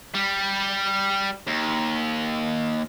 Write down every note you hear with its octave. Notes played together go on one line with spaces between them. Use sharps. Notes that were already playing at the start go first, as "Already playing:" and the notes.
G3
D#2